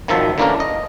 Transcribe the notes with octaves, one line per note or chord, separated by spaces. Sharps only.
G#1 D#3 F3 F#3 E5 A5
D3 E3 A#3 C#4 D4 A#4
D#5